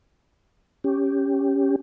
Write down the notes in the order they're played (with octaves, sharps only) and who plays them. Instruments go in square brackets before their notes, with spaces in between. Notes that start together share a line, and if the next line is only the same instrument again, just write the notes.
[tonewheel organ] C#4 G4